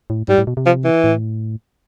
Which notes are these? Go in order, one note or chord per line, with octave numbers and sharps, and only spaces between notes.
A2
G#2 G3
A2
B2
C3
F3
E3
A2